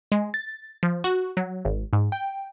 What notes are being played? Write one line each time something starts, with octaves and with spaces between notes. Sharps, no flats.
G#3
A6
F3
F#4
F#3
G#1
G#2
G5